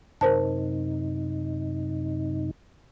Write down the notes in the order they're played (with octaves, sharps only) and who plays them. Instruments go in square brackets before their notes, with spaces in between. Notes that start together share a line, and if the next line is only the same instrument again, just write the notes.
[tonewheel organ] F#2 C3 D#4 [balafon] A#4 C5 A5